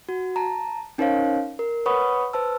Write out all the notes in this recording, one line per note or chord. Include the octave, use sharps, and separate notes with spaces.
F#4
A5 A#5
C#4 D#4 A#4 C5 C#5 F5
A#4
B4 C#5 F#5 B5 C#6 D#6
B4 C5 A5 E6